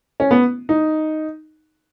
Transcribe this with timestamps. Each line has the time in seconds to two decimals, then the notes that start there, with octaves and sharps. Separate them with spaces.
0.20 C#4
0.31 B3
0.69 D#4